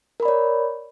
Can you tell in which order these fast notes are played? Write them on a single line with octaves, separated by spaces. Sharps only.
A#4 B5 D5 C#5